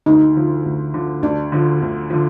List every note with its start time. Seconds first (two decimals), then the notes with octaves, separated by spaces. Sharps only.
0.06 D2 D#4
0.35 D3 F3
0.65 D2
0.94 D3 F3
1.23 D2 D4
1.52 D3 F3
1.82 D2
2.10 D3 F3